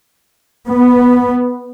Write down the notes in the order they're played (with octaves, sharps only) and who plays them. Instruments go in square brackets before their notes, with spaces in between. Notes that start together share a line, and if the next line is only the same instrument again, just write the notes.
[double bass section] B3